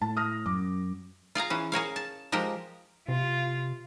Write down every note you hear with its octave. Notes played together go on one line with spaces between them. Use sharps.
A2 A5
D#6 F6 A#6
F#2 D6
F4 G#4 F5 A#5
E3 C#4
G#4 A#4 C#5 F5
A5
F3 G#3 G4 A#4
C3 F4